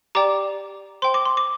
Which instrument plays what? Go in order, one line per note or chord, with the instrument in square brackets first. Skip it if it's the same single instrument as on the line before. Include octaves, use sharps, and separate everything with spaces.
[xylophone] G4 D5 G5 A#5 D6
C5 G5 C6
D6
C6
D6